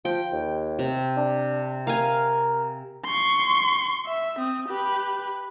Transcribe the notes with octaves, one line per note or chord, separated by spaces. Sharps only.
F3 G5
D#2
C3
D4
A#4 F5 G#5
C6 C#6
E5
C4 D#6
G4 B4